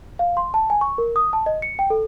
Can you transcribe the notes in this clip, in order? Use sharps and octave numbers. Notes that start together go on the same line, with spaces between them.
F5
C6
A5
G#5
C#6
A#4
D#6
A5
D#5
C#7
G5
A4